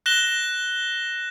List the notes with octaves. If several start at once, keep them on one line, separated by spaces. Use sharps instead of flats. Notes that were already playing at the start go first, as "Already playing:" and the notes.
F#6 A#6 E7 G7